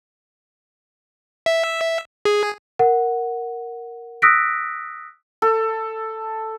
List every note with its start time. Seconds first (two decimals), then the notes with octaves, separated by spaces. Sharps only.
1.46 E5
2.25 G#4
2.79 A#4 F#5
4.22 D#6 E6 F#6 A#6 B6 D7
5.42 A4